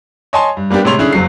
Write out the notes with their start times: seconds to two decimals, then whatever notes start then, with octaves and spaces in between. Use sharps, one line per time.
0.33 C#5 D#5 G#5 A5 C6
0.57 G2
0.70 G3 A#3 B3 D4 G4
0.84 A2 C3 G#3 C#5 C6 F7
0.99 D3 C#4 E4 G#4
1.13 F#1 F#3 C7